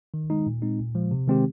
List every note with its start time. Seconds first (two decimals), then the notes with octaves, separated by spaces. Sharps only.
0.14 D#3
0.30 G#3 D#4
0.46 A#2
0.62 G#3 C4 D#4
0.79 A#2
0.95 F3 G#3
1.11 C3
1.28 D#3 G#3 C4 G4